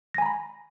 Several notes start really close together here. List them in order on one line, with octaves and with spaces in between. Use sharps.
A#6 G#5 A#5 B5